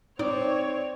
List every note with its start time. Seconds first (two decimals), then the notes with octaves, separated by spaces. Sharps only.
0.19 C4 D#4 C#5 D5